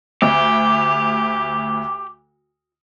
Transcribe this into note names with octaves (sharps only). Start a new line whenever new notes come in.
D2 G4